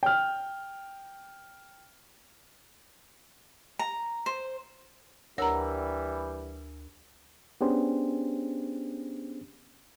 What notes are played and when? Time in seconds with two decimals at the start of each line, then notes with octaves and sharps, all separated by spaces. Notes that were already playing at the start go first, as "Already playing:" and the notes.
0.03 G5 F6
3.79 A#5
4.26 C5
5.38 D2 E3 G3 A#4 C#5 A#5 E6
7.61 B3 C#4 D4 G4 G#4 C5